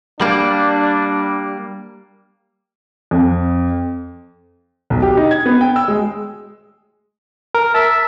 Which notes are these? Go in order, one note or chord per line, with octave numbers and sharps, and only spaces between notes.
G3 A#3 D4
F2
B1
G4
D#4
G#6
B3
G5
E6
G#3
A#4
E5 A5